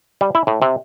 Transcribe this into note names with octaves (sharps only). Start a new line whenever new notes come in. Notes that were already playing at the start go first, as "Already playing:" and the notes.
G3
E4
A2
C3